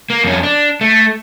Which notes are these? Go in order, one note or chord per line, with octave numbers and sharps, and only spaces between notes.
A#3
F2 C#4
D4
A3